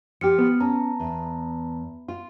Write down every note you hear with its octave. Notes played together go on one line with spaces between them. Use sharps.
F3 G4 F6 C#7
B3
C#4 A5 A#5
E2
F4